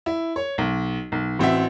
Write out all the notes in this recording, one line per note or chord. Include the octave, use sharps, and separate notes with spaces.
E4
C#5
B1
B1
A1 C4 F#4 E5